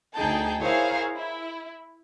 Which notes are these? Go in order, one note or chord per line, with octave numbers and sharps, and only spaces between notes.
D2 D#4 G#4 G5 A5 G6
E4 G#4 A#4 C5 C#5 F5
E4